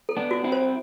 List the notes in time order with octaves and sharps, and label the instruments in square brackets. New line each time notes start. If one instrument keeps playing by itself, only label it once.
[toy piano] A4
[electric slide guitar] B3 D4
[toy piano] F#4
[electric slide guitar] C4 E4
[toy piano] C5